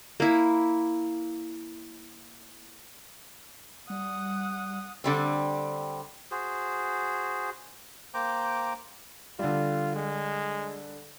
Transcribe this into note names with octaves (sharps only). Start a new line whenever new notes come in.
A#3 E4
G3 F#5 D#6
D3 G3 C4
F#4 G#4 C5
A#3 C5 G5 A#5 D6
D3 G3 F4
G#3